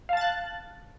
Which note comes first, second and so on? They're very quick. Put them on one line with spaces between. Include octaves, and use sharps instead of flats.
F5 A5 A6 F#6